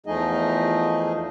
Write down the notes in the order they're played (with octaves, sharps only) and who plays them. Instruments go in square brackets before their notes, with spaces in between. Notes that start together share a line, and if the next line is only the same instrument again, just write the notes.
[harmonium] E2 F3 A3 D#4 G#4 D#5